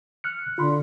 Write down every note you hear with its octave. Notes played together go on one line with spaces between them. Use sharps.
F6 F#6 C#7
D3 F4 B5 C6